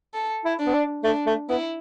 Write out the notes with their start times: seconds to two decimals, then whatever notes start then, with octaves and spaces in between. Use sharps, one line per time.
0.14 A4
0.45 E4
0.59 D4
0.66 B3
0.74 D4
1.04 A3 D4
1.26 A3
1.49 B3 E4